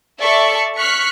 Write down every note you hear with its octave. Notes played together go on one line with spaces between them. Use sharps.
A4 D5 E5 C#6
C#6 F6 F#6 B6